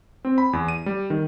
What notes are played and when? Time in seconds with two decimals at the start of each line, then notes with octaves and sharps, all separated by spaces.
0.25 C4
0.38 B5
0.53 E2
0.68 D#7
0.86 G3
1.10 D#3